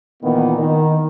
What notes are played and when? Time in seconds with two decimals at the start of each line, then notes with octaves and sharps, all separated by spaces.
0.23 A#2 D#3 E3 A#3 B3
0.59 D#3